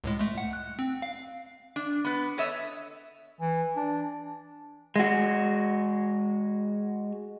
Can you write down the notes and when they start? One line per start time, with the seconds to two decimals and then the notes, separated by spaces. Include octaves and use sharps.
0.04 C#2 A2 G#3
0.19 G#3 A3
0.38 F#5
0.53 F#6
0.79 C4
1.02 F5
1.76 D4
2.04 B3 B4
2.38 A4 C#5 D#5 E5
3.41 E3
3.76 D4
4.96 G#3 F#4